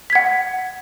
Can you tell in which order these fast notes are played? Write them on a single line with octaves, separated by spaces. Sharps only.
B6 G#6 F#5